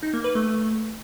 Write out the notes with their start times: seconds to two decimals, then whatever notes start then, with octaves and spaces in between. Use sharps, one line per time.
0.03 D#4
0.13 A#3
0.24 B4
0.35 A3